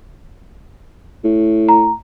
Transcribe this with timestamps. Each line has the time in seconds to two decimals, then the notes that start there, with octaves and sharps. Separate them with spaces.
1.24 A2
1.69 A#5